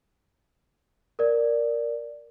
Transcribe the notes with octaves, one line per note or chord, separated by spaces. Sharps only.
A#4 D5